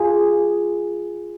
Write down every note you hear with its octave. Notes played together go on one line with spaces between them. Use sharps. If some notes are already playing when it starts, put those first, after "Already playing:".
Already playing: F4 G#4